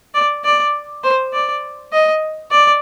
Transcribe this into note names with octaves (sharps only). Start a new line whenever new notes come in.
D5
D5
C5
D5
D#5
D5